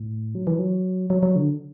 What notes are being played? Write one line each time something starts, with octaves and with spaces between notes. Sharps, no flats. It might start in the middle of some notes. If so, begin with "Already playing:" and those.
Already playing: A2
F#3
E3
F#3
F#3
F#3
D3